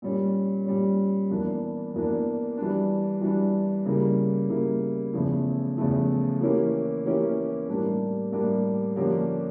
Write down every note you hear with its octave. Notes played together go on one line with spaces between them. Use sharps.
A#2 G3 C#4
A#2 G3 C#4
E2 E3 A#3 D4
E2 E3 A#3 D4
E3 G3 D4
E3 G3 D4
C#3 G3 A#3 E4
C#3 G3 A#3 E4
E2 C#3 F3 A3 E4
E2 C#3 F3 A3 E4
E3 A#3 C#4 E4 G4
E3 A#3 C#4 E4 G4
A2 G3 A#3 D4 G4
A2 G3 A#3 D4 G4
D3 F3 A#3 C#4 G4